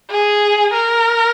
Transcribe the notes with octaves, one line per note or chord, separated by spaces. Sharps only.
G#4
A#4